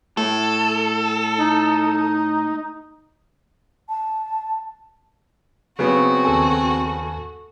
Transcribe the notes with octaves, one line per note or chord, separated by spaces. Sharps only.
A2 A4
D#4
A5
C#3 F#3 B3 C4 F#4
D#2 A4 G#5